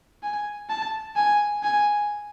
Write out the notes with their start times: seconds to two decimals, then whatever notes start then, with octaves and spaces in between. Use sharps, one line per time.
0.23 G#5
0.70 A5
1.16 G#5
1.63 G#5